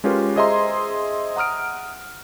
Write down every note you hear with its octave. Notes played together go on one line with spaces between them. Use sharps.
G#3 C#4 F4 G4 A#4 B4
G#4 C5 D#5 E5 A#5 C6
F#5 A#5 D#6 F6 D7